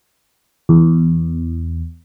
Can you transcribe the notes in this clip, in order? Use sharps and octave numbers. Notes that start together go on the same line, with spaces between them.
E2